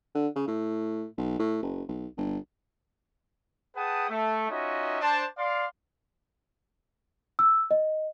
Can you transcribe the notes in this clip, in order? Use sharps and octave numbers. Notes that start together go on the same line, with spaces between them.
D3
C#3
A2
B1
A2
F#1
B1
G1
G#4 B4 F#5 G5 A5 D#6
A3
C#4 D#4 F4 F#4 D#5 E5
D4 C5 A5
D5 F5 C6
E6
D#5